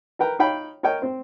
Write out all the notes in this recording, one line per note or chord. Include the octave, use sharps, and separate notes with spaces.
A#4 B4 G5 A#5
D#4 C#5 F5 G5 B5
A#4 C#5 D#5 G5
C4 C5